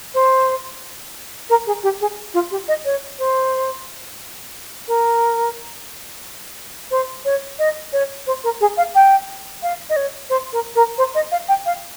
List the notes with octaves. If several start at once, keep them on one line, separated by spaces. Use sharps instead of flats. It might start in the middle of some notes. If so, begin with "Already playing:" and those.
C5
A#4
G#4
G4
G#4
F4
G4
D#5
C#5
C5
A#4
C5
C#5
D#5
C#5
C5
A#4
G#4
F5
G5
F5
D#5
C#5
C5
A#4
A#4
C5
D#5
F5
G5
F5